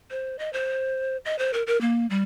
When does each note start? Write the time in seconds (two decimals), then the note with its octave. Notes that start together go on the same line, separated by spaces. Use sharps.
0.11 C5
0.39 D#5
0.53 C5
1.25 D#5
1.39 C5
1.53 A#4
1.67 A#4
1.81 A#3
2.10 G3